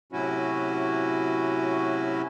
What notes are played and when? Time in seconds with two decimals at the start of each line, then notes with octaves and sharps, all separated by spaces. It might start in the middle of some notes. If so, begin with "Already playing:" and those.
0.12 A2 C3 F#3 C#4 E4 F#4